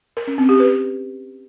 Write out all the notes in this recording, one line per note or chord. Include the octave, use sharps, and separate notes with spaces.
A#4
C#4
C4
G4
B4